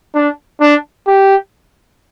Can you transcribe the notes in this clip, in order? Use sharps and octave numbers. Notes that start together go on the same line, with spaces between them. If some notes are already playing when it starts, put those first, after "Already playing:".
D4
D4
G4